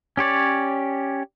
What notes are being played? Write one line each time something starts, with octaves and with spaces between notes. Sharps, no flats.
C#4 G4 C#5 D5